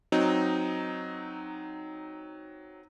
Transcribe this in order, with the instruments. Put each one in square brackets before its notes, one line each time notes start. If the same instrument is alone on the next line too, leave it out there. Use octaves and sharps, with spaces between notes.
[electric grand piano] F#3 C4 D#4